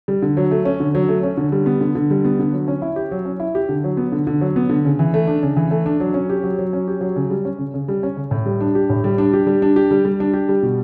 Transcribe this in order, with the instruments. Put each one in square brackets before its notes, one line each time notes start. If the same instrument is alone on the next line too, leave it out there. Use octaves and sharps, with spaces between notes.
[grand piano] G3
D3
F#3
A3
C#4
D3
F#3
A3
C#4
D3
G3
B3
D3
D3
G3
B3
D3
F#3
C#4
E4
G4
F#3
C#4
E4
G4
D3
F#3
B3
D3
D3
F#3
B3
D3
C#3
E3
A3
D4
C#3
E3
A3
D4
F#3
C#4
G4
F#3
F#3
C#4
G4
F#3
C#3
G3
C#4
C#3
C#3
G3
C#4
C#3
A2
G3
D4
G4
A2
G3
D4
G4
G3
D4
G4
G3
G3
D4
G4
G3
B2